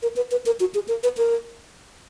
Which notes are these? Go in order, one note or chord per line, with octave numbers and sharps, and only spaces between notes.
A#4
B4
B4
A#4
F#4
G#4
A#4
B4
A#4